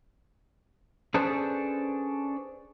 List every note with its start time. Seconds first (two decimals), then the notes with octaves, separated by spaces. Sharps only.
1.14 C#4 D4 G#4 A4 B4 C5